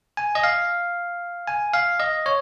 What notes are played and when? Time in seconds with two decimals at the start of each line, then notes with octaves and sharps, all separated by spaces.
0.17 G#5
0.35 D#5
0.44 F5
1.47 G#5
1.74 F5
2.00 D#5
2.26 C#5